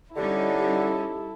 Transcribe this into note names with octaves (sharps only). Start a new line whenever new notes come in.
D3 G3 C#4 D#4 E4 G4 A4